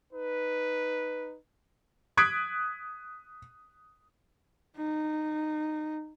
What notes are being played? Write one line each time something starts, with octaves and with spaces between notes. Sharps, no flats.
D#4 B4
D#6 F#6 G#6 B6 D7
D#4